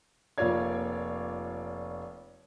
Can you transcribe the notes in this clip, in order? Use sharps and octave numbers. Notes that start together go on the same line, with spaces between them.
F1 A#3 F4 C#5 D5 G#6